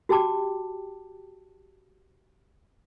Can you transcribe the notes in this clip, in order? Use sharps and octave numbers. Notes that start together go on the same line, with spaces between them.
F#4 G4 G5 A5 D6